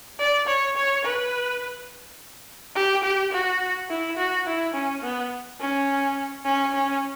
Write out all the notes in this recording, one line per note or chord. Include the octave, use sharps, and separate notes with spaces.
D5
C#5
C#5
B4
G4
G4
F#4
E4
F#4
E4
C#4
B3
C#4
C#4
C#4